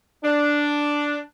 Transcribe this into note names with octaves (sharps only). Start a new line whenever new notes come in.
D4